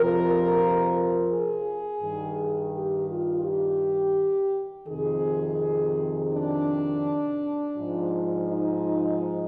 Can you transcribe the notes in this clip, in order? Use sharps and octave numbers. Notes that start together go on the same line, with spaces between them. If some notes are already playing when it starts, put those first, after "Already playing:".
Already playing: F2 C3 F3 A#4
G#4
G2 D#3
G4
F4
G4
F2 C3 D#3 G#4
D4
G#2 F3
D#4